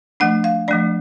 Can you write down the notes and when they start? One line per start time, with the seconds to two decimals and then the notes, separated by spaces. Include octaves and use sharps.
0.20 F3 A3 D4 F#5
0.44 F5
0.68 F3 A3 D4 D5